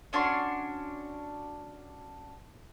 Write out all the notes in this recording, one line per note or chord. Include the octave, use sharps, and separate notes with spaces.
C#4 D4 F#4 C6